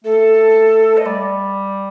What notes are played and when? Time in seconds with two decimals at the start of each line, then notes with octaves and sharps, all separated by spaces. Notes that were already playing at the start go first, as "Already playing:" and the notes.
0.04 A3 A4
0.98 D#5
1.05 G3 D5